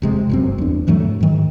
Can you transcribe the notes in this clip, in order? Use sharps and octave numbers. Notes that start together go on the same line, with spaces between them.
E1 C3 G#3
G1 F#2 C4
E2 D4
G#2 E3 F#3 A3
G#2 D#3